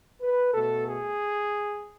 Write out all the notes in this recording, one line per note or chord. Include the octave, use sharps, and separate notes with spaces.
B4
B2 A3 A4
G#4